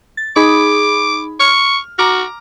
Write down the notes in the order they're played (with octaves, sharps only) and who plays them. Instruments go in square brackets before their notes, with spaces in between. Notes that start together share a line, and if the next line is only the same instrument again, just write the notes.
[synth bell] A6
[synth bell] D#4 G#4 B5 [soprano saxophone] D6
[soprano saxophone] C#6 [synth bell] F6
[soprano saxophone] F#4 [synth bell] A#5 D6 F6